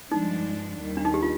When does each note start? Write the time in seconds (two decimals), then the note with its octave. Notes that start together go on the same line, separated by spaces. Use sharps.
0.10 G2 F3 G#3 D4 D#4
0.79 D#2 D#3 G3
0.97 D4
1.05 D#4
1.14 G4
1.23 F4